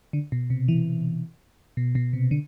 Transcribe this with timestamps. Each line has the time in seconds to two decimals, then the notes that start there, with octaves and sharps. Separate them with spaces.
0.13 D3
0.32 B2
0.50 C3
0.68 E3
1.77 B2
1.95 B2
2.13 C3
2.31 D3